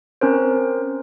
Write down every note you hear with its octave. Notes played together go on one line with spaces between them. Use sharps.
C4 C#4 A#4 C5